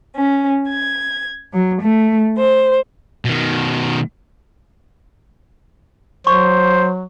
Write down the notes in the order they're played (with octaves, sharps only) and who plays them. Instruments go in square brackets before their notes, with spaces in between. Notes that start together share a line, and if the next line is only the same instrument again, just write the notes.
[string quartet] C#4
G#6
F#3
A3
C5
[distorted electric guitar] B2 D#3
[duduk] F#3 [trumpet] C5 [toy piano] C#6